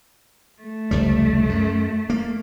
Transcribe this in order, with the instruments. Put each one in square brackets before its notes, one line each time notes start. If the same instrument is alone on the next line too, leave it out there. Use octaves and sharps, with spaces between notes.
[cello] A3
[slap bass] F1 C#2 G3
F#2
A#3